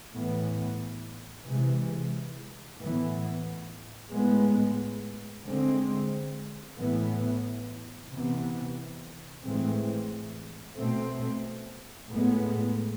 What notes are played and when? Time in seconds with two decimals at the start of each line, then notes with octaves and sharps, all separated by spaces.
0.13 A2 E3 B3
1.46 C3 E3 G#3
2.79 A2 E3 B3
4.12 A2 G#3 B3
5.45 D3 G#3 C4
6.78 A2 E3 B3
8.11 C3 E3 B3
9.43 A2 E3 G#3 C4
10.77 B2 A3 C4
12.10 A2 G#3 B3